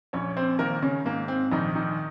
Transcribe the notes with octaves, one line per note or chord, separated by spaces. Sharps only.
A#1 C#4 C#5
C4 C5
D#3 A#3 A#4
C#3 C#4
G#2 A#3
C4
A#1 D#3 D#4
D#3 D#4